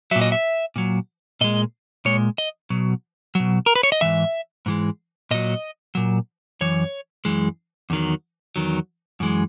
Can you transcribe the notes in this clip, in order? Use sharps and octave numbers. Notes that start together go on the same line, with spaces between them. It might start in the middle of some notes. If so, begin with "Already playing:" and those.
A#2 F#3 E5
D#5
E5
A#2 F#3
A#2 G#3 D#5
A#2 G#3 C#5
D#5
B2 F#3
B2 F#3
A#4
B4
C#5
D#5
G#2 E3 E5
G#2 E3 G#3
A#2 F#3 D#5
A#2 F#3
F#2 E3 C#5
F#2 E3 G#3
E2 D#3 F#3
E2 D#3 F#3
F#2 E3 G#3